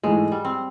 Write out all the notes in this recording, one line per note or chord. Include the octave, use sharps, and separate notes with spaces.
G#2 E3 G#3 A3
G3
C4